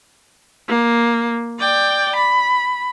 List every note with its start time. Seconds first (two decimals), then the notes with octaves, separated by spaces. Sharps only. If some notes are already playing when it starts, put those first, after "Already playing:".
0.68 A#3
1.59 D5 G5
2.16 B5